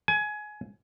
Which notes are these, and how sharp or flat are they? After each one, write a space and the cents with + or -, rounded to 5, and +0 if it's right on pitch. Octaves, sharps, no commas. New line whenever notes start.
G#5 +20